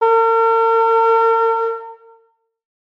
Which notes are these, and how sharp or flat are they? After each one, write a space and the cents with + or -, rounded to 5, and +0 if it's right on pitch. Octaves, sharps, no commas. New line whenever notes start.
A#4 -45